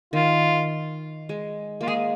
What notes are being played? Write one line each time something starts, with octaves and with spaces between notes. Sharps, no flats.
D#3 F4
G#3
A#3 F4
G#3 G#4